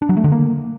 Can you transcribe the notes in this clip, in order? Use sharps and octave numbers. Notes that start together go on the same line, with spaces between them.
D4
F#3
A3
D3
A#3